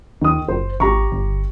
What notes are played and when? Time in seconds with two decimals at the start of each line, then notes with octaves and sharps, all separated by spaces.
0.22 D#2 D#3 D#6
0.48 F#1 C5
0.80 G#1 G4 A#5 C#6
1.12 G1